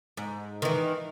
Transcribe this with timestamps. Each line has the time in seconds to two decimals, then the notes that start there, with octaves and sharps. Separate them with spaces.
0.17 G#2
0.62 D#3 E3